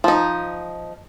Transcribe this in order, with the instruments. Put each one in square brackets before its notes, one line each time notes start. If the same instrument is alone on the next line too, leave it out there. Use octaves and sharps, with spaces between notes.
[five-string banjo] F3 D#4